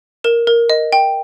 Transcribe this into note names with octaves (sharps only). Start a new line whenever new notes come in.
A#4 E7
A#4
D#5
G5